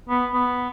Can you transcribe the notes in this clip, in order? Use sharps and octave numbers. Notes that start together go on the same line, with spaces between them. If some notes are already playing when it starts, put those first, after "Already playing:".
B3
B3